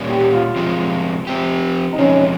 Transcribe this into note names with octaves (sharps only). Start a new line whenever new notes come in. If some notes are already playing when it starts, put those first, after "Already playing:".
Already playing: A#2 G3 C#4
G4
F4
C3 F3 G#3
F3 C4 G4
D#4
C3 F3 G#3 C#4